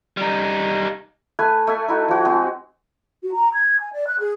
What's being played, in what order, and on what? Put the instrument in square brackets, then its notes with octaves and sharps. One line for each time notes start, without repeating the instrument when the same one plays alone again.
[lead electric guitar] G3 D#4
[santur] A3 B4 G#5
A3 E5 G#5
D#4 E4 F#4
F3 F#4
G#3 C4 F#4 G#4
[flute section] F#4
A#5
G#6
G#5
D5
F#6
G#4